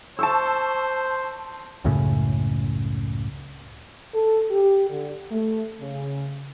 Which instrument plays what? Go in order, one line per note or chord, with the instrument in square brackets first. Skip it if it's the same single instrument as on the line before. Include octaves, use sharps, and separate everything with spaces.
[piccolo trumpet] C5 [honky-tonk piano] A5 C#6 E6
[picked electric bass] C#2 F#2 A2 C#3
[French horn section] A4
G4
D3
A3
C#3